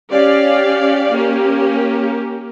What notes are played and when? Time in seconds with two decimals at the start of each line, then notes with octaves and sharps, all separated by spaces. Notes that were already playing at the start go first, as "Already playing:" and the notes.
0.11 C#4 G4 D5 F5
1.13 A#3 C#4 G4